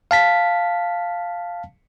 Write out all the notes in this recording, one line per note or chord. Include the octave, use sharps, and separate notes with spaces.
F5 A5 B6